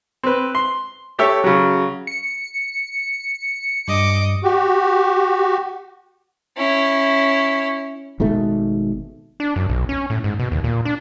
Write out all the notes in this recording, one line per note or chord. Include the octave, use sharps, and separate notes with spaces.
C4 B4
C6
A3 G4 C#5 E5
C#3 F#3
C#7
G2 G3 D#5 D6
F#4 G4
C#4 E4
G#1 G#2 B2 A3
D4
F#2
B1
C#4
A2
G#2
B2
D#2
A#2
D4